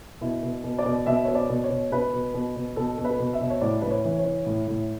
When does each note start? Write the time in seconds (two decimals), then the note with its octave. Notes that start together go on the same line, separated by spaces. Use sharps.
0.21 B2 E4
0.43 B2
0.64 B2
0.78 D5
0.86 B2
1.06 B2 E5
1.24 B2 C#5
1.35 D5
1.49 B2
1.64 C#5
1.70 B2
1.91 B2 B4
2.13 B2
2.34 B2
2.56 B2
2.76 B2 A4
2.98 B2
3.05 B4
3.19 B2
3.33 E5
3.41 B2
3.50 C#5
3.61 A2 D5
3.82 A2 B4
3.90 C#5
4.05 E3
4.18 C#5
4.26 E3
4.46 A2
4.68 A2